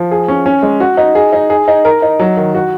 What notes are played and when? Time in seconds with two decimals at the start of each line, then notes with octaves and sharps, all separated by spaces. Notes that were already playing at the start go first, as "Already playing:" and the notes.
Already playing: F3
0.11 G#4
0.28 C#4
0.46 C#4
0.63 G#3
0.80 F#4
0.97 D#4
1.15 G#4
1.33 D#4
1.50 G#4
1.68 D#4
1.85 A#4
2.02 D#4
2.20 F#3
2.37 D#3
2.55 F#4